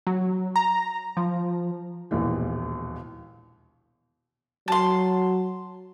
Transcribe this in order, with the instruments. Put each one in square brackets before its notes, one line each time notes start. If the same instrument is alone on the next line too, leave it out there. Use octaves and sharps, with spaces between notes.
[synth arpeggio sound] F#3
A#5
F3
[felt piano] E1 A#1 D#2 E3
[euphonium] F#3 [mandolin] A5 C6